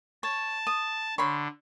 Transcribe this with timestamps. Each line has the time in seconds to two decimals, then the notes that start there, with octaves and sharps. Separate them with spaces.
0.23 C#5 A5
0.67 D#6
1.18 D3 C#5 B5 C6